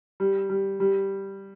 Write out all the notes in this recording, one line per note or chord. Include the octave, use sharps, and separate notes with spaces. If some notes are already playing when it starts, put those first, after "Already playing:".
G3
G3
G3